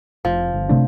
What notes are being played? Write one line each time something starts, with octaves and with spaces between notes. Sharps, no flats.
F1 F3
G1
C3 A3 D4